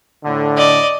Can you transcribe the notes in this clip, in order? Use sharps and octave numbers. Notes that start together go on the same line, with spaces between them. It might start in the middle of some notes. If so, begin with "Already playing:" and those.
A2 D3
D5 D#5